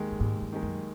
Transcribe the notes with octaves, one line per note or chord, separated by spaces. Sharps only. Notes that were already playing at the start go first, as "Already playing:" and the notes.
Already playing: D#2 D#3 G#3
G2
D#2 G#2
G2
D#3 G#3
F#2